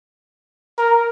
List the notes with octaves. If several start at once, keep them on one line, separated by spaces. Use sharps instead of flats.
A#4